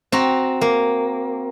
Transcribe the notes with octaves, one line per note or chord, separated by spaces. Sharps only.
C4 F#4 A#5
A#3